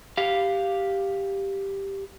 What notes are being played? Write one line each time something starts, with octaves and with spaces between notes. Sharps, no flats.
G4 F5